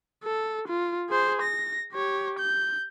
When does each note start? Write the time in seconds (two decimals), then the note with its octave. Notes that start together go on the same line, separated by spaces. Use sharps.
0.23 A4
0.68 F4
1.09 G#4 C5
1.42 A#6
1.93 G4 C#5
2.39 G6